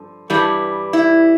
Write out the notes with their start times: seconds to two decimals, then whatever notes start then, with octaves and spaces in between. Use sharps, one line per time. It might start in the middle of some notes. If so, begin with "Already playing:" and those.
Already playing: G2 D3 F3
0.30 G2 E3 G3
0.93 E4